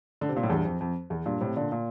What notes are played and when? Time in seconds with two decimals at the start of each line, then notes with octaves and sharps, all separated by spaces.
0.21 D3
0.29 C3
0.36 A#2
0.43 A2
0.50 E2 G2
0.65 F2
0.80 F2
1.10 E2
1.26 G2 A#2
1.41 A2 C3
1.56 A#2 D3
1.72 A#2